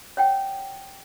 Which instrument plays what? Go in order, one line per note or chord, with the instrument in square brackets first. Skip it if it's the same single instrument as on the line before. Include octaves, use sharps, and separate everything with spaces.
[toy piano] C#5 F#5 G5